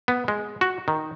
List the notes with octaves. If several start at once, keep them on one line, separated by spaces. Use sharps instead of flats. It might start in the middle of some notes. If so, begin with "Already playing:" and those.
B3
G#3
F#4
D#3